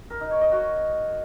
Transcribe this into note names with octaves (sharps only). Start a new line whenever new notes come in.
A#4
D#4
C#5
D#5
F#4